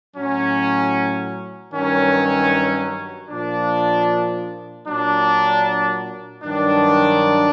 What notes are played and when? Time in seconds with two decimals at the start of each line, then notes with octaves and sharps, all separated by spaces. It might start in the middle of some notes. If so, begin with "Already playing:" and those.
0.15 A2 F#3 C#4
1.73 G2 D#3 F#3 C#4
3.29 A#2 F3 D4
4.86 A#2 F#3 D4
6.43 G2 D#3 F#3 D4